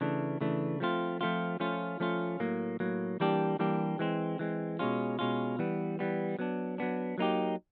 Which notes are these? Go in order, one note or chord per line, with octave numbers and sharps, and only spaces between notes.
C#3 E3 A3 D4
C#3 E3 A3 D4
F3 A3 C4 F4
F3 A3 C4 F4
F3 A3 C#4 F4
F3 A3 C#4 F4
A2 F#3 A#3
A2 F#3 A#3
E3 G3 A#3 D4 G4
E3 G3 A#3 D4 G4
E3 G#3 C4
E3 G#3 C4
B2 G#3 C#4 F4
B2 G#3 C#4 F4
E3 G3 B3
E3 G3 B3
F#3 B3 D4
F#3 B3 D4
F#3 A#3 D#4 G4